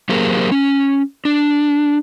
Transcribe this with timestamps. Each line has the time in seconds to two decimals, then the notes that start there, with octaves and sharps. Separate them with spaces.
0.09 F#3 A#3 G4 G#4 A#4 C5
0.52 C#4
1.25 D4